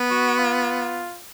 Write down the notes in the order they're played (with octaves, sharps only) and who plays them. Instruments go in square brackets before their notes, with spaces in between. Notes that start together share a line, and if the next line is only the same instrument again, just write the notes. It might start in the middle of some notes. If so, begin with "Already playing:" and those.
Already playing: [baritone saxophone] B3
[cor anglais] F#4
F4